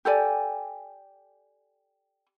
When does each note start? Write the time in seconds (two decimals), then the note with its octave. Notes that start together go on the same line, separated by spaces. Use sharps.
0.05 G4 A4 D5 G#5